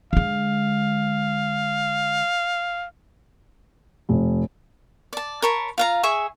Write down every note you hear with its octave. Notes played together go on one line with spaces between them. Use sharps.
D3 G#3 F5
F1
D5 A5
A#4 C#5 A5 B5
F4 F5 A#5
G#4 E5 G#5 C#6